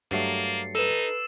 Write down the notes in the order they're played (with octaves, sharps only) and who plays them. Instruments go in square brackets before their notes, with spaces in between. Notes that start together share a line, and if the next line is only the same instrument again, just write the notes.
[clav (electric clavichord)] G2 F#3 A3 [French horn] A#3 [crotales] A6 C7 C#7
[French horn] D#4 [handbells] A4 B4 [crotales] E6 E7 F#7